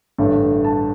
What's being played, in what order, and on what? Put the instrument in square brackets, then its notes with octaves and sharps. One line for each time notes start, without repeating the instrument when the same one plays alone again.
[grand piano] A1 G2 D3 A3
A5